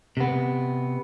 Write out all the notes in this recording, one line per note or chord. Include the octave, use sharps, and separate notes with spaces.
C3 B3